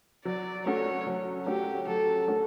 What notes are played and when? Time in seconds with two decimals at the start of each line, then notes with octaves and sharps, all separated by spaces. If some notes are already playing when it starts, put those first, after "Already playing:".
0.25 F#3 D5
0.66 A3 C#4 F#4 A4 C#5
1.07 F#3
1.46 A3 C#4 F#4 G4 A4
1.87 F#3 A4
2.28 A3 C#4 F#4 A4